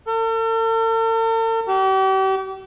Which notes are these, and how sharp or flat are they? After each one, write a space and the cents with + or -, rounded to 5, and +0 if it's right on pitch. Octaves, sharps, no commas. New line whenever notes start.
A4 +45
G4 -40